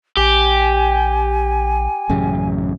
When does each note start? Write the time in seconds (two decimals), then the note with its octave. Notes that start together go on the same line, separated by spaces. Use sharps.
0.17 A#1 G4 G#5
2.09 A1 F#2 C#3